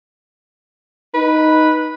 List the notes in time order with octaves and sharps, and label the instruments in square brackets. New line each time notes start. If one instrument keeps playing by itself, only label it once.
[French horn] D#4 [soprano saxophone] B4